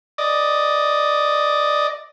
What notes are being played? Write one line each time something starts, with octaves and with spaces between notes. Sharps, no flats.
D5 D#5